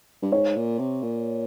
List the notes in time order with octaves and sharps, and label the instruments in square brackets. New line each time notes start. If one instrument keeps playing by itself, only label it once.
[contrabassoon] G2
[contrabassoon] G#2 [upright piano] C#5
[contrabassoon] A#2
C3
A#2